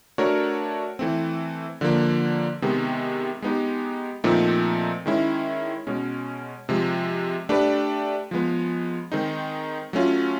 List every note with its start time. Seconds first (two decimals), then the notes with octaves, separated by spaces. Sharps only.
0.18 A3 D4 F#4 A#4 C#5
0.99 E3 A3 C4
1.81 D3 F3 A#3
2.62 C3 D#3 G#3 B3
3.42 G#3 B3 D#4 G4
4.24 A#2 F3 A3 C4 D#4
5.06 D#3 G#3 C#4 E4
5.87 B2 G#3 C#4
6.69 C3 F3 G#3
7.49 A3 D4 G4 B4
8.31 F3 G#3 B3
9.12 D#3 G#3 C4 D#4
9.93 F#3 A3 C#4 F4